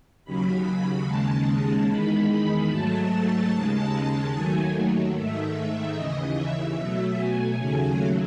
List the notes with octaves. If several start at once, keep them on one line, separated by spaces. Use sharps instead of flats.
D#2 C#3 F#3 B5
D#2 C#3 G#3 A5
E2 D#3 G#3 B5
B5
G#2 F#3 A3 A5
D#2 C#3 G#3
D#2 D#3 F#3 A3 G#5
G#2 D#3 A3 E5
D#2 C#3 E3 D#5
E5
B2 F#3 A3
G#5
D#2 C#3 F#3 A3